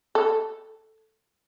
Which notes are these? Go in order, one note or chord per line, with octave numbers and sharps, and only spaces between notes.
A4